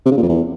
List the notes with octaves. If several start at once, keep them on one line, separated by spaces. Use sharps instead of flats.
C3
C#3
A#2
F2
E2